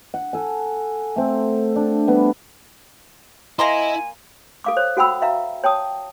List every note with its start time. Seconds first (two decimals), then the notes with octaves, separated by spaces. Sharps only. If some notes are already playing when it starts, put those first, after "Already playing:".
0.14 F#5
0.33 A4 G#5
1.16 A3 C4
1.76 D4
2.07 G3 B3
3.59 A#3 E4 D#5 G#5 A#5 C6
4.64 A4 F5 D6
4.77 C5 C#5
4.97 F#4 A4 F#5 G5 B5 E6
5.22 E5 F5 A#5
5.64 C#5 G5 A5 D#6